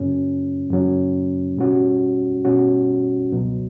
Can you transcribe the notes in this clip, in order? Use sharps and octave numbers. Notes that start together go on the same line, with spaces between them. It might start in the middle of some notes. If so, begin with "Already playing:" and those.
Already playing: F#2 C#3 F#3 C#4
F#2 C#3 F#3 C#4
B2 G3 C#4 F#4
B2 G3 C#4 F#4
C#2 B2 F#3